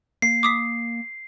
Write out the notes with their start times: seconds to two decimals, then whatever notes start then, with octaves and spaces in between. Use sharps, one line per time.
0.22 A#3 C7
0.43 D6 D#6 B6